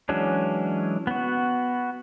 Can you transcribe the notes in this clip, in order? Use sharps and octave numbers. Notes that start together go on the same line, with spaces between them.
E3 F#3 G#3 C#4 D4
B3 F#4